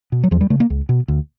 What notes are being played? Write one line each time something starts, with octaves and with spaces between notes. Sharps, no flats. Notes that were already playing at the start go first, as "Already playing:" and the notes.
B2
F#3
E2 F3
G3
C#3 A3
A#3
C#2
B2
D2